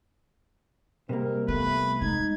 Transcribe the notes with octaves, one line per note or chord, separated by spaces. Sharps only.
C3 G3 G#3 A#3 C4 A#4
A3 B3 B4
G#3 D#4 G#6